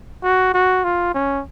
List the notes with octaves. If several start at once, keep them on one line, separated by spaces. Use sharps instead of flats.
F#4
F#4
F4
C#4